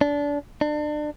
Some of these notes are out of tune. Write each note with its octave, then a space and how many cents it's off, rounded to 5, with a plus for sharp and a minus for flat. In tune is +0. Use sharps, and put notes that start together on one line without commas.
D4 -25
D4 +30